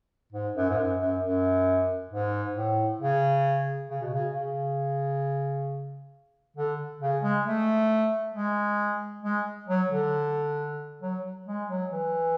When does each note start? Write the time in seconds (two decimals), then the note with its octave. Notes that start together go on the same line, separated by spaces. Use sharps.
0.32 G#2
0.55 F#2
0.69 G#2
0.78 F#2
1.00 F#2
1.22 F#2
2.11 G#2
2.55 A2
3.00 C#3
3.90 C#3
4.01 B2
4.14 C#3
4.33 C#3
6.57 D3
7.02 C#3
7.23 G#3
7.46 A3
8.34 G#3
9.23 G#3
9.68 F#3
9.90 D3
11.02 F#3
11.47 G#3
11.69 F#3
11.91 E3